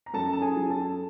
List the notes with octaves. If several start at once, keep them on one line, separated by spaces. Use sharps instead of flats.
A#5
F#2 A4 A5
A5
G#4 G#5
F#3
A4 A5